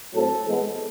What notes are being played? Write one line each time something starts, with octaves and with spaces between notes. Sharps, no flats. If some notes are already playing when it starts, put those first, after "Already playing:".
A2 F#3 A3 C4 A4
E3 G#3 B3